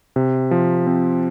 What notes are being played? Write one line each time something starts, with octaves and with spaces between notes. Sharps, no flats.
C3
F3
C4